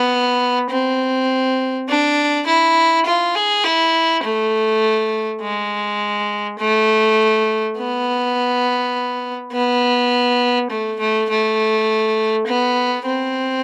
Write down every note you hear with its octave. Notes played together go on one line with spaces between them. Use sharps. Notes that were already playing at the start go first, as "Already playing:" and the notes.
Already playing: B3
C4
D4
E4
F4
G#4
E4
A3
G#3
A3
B3
B3
A3
A3
A3
B3
C4